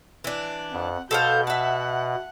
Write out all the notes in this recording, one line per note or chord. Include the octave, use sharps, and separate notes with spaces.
E3 D4
F2 F#5
B2 A4 C5 F5 G6
E5 F#5 A5